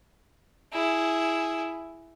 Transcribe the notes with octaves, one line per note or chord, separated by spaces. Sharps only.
E4 G#4